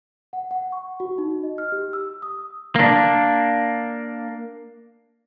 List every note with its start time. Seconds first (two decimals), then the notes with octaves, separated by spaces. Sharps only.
0.33 F#5
0.51 F#5
0.72 C#6
1.00 F#4
1.18 D#4
1.43 D#5
1.58 F6
1.72 G4
1.93 E6
2.22 D#6
2.76 A#3 D4